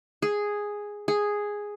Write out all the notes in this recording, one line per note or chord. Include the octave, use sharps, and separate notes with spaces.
G#4
G#4